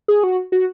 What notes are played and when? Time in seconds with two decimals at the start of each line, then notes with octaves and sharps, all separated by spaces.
0.08 G#4
0.24 F#4
0.52 F#4